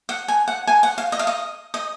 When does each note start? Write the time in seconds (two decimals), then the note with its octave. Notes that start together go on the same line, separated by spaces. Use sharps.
0.09 F#5
0.28 G#5
0.48 F#5
0.67 G#5
0.83 F#5
0.98 F5
1.12 D#5
1.19 F5
1.27 D#5
1.74 D#5